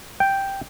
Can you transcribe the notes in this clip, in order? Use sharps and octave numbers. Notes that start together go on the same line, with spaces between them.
G5